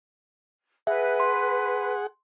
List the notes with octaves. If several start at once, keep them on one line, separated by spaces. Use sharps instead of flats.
G#4 B4 E5 F#5
C6